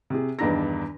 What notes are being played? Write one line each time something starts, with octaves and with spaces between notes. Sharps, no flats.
C3 G#4
E2 G2 D#3 D4 A#5 A#6